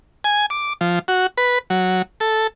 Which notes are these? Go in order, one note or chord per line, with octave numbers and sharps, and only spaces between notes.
G#5
D6
F3
F#4
B4
F#3
A4